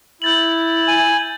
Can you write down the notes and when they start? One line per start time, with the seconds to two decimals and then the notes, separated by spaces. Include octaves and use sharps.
0.22 E4 G6 A6 F#7
0.88 G#5